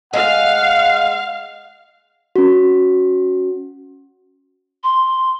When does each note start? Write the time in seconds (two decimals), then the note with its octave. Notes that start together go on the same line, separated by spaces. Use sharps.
0.13 G#3 F5 F#5
2.36 C#4 F#4
4.83 C6